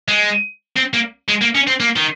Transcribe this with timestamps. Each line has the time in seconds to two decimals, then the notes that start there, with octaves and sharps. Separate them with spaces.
0.08 G#3
0.77 C4
0.93 A#3
1.28 G#3
1.41 A#3
1.55 C#4
1.67 C4
1.80 A#3
1.96 D#3